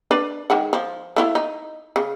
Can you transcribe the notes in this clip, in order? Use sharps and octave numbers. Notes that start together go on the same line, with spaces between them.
D4 B4 D5
D#3 G#3 F#5
F3
A3 E4 F4
D#4
C#3